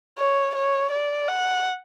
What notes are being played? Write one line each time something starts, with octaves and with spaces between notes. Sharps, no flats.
C#5
C#5
D5
F#5